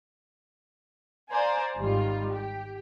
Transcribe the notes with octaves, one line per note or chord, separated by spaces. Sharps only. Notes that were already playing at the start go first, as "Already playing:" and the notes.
C5 D5 F5 G#5 A#5
G#1 D#3 G3 F4
G4